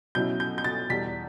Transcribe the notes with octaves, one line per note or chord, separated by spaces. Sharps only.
B2 F#3 C#4 E4 G6
G6
G6
A6
E2 B2 G3 B6